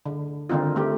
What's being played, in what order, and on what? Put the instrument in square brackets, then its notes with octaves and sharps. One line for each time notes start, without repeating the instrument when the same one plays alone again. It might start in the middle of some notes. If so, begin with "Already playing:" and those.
[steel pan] D3
D3 D#3 C4 D#4 F4
A3 G4